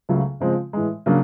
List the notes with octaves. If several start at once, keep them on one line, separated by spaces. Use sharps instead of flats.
C#2 C#3 F#3 A3
C#3 F3 G#3 C4
A2 E3 G#3
C#3 F#3 A#3 D4